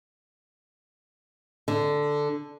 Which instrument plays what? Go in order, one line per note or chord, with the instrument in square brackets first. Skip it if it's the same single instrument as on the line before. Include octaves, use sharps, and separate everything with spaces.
[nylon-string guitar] D3